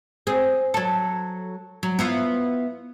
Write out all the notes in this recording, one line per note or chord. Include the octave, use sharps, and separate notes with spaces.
C4 G#4
F#3 A4
F#3
B3 E4 F4